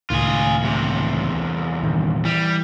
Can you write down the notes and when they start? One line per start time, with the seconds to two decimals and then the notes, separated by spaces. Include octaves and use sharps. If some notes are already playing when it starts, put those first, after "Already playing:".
0.10 C#2 A2 D#3 F4 G#4
0.63 E2 C3
1.84 G2 A#2 D#3
2.25 E3 G3